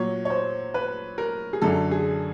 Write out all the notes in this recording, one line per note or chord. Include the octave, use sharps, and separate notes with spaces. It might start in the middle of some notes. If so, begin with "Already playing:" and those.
Already playing: A#2 F#3 C#5
C#5
C5
B4
A#4
G#4
F#2 D3 F#3 A4
G#4